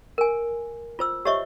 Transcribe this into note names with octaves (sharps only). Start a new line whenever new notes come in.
A#4 G#5
F4 C5 E6
G4 C5 C#5 D#5 E5 C#6